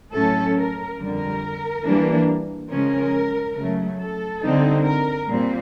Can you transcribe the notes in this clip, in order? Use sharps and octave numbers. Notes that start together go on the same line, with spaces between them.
A2 F#3 A3 C#4 A4
A#4
F2 D3 G3 A#4
E3 G3 A#3 D4
C#3 F3 G#3 C#4 A#4
C#3 F#3 A3
A4
D3 G3 C4 D#4
A#4
A#2 G3 C4